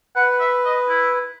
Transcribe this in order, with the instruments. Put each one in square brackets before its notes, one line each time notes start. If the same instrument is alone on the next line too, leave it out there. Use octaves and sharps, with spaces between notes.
[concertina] B4 [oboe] F#5
[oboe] E5
D#5
E4